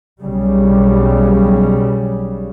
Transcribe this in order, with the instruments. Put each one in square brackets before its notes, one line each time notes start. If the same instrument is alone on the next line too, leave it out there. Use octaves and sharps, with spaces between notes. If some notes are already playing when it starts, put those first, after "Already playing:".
[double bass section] B1 C#3 G3